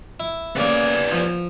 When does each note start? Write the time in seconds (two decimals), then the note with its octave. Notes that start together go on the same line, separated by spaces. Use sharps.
0.20 E4
0.56 C#3 A#3 B3 D5
1.11 F3